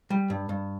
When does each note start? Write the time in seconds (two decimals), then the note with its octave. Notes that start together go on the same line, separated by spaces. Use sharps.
0.10 G3
0.30 G2
0.49 G2